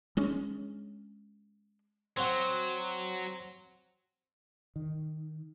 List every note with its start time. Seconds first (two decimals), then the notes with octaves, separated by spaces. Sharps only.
0.17 G#3 C#4 D4
2.17 F#3 C4 F#4
4.76 D#3